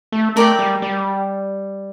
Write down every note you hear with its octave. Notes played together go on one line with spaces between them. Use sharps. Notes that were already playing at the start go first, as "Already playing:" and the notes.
A3
A3 A#4 D5 G5
G3
G3